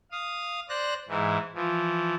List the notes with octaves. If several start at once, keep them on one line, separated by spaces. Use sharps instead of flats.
F5 D#6
C5 D5 F#6 A#6
G#2 E3
E3 F3